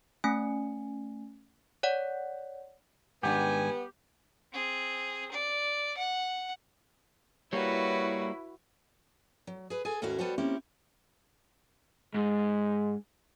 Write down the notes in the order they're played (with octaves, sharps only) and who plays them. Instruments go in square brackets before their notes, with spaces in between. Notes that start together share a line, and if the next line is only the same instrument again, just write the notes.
[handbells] A3 C#4 G#5
C#5 D5 F#5
[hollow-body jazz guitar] G#2 D#3 D4 [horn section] G3 B3 [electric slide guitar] G4 [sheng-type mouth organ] G#5
[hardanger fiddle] C4 G#4
D5
F#5
[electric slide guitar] G3 A#3 [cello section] E4 [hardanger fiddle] F#4 B4 [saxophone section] C#5
[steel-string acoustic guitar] F#3
G#4 B4
G#4 A4 G#5
D#2 G#2 C#4 E4 F#4 F5
G3 B3 F#4 A4 C5 C#5
A#3 C4 C#4 E4 G4
[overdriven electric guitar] G#2 [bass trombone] G#3